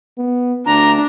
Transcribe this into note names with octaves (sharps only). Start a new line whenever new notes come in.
B3
D2 D4 A#5